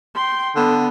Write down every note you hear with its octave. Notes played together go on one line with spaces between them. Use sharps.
G5 C6
D3 B3